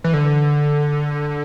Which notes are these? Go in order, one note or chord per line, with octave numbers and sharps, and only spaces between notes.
E3
D3